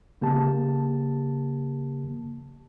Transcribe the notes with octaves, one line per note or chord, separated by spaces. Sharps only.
C#3 A#3 G4 A5